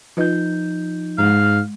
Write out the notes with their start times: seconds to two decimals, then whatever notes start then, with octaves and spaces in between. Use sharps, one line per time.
0.17 F3 D#4 F4 B4 D#5 G6
1.18 G#2 G#3 F5 A#5